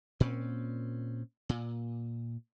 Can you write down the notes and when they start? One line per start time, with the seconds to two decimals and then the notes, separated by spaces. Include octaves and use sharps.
0.20 A#2 C4 C#4
1.49 A#2